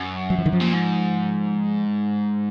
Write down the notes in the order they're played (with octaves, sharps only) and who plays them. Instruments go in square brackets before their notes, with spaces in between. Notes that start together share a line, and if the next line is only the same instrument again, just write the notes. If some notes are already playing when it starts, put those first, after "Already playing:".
Already playing: [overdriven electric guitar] F#2
[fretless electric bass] F#3
F3
D#3
F3
[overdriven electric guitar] A#2
G#2